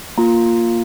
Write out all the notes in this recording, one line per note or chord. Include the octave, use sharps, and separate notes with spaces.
A#3 F4 A#5